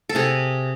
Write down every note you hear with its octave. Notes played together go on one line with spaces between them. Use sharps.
A4
C3 G#4